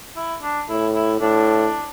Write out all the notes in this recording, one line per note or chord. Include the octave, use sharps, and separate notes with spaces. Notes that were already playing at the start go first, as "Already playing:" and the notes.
E4
D4
A2 E4
E4
A2 D4